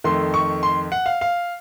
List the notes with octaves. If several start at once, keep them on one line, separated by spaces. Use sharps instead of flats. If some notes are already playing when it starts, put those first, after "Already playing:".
F2 D#3 A3 C6
C#6
C6
F#5
F5
F5